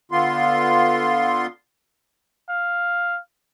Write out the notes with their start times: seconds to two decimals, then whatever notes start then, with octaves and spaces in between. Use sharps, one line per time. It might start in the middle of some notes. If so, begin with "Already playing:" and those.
0.12 D3 B3 F4 C6
2.49 F5